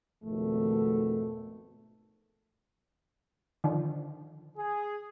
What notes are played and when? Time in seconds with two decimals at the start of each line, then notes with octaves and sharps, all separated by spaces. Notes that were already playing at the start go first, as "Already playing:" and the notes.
0.23 G#1 F2 B2 D#3 A3
3.64 D3 D#3 F3
4.58 G#4